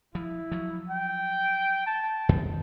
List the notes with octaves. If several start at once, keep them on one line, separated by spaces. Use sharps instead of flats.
F3 E4
F3 F#3
G5
A5
F2 B2 D#3